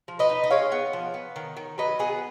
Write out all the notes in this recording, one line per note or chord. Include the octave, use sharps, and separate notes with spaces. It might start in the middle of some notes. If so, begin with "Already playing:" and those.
F3
B4 D#5
D#4
D#5
G#3 C#5 F5
B3
F3
B3
D#3
D#3
F#3 B4 D#5
B3 G#4 B4